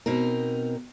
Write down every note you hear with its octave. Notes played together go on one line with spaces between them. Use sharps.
B2 C4 D#4 A#4